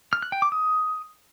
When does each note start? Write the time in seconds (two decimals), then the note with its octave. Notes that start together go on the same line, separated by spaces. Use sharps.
0.13 F6
0.22 F#6
0.32 G5
0.42 D6
0.52 D#6